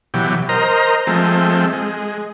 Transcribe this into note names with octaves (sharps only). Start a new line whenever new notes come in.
B2 E3 F#3 G4
A#4 C5 D#5 A#5
F3 G#3 A3 C4
G#3